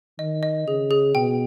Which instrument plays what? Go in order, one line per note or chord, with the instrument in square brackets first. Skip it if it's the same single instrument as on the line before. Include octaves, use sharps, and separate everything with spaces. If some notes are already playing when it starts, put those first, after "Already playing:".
[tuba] D#3 [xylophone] D#5
[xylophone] D#5
[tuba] C#3 [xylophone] G#4
[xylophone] G#4
[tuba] B2 [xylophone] G5